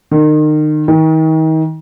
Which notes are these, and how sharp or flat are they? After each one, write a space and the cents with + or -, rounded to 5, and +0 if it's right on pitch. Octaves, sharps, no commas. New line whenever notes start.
D#3 -30
D#3 +35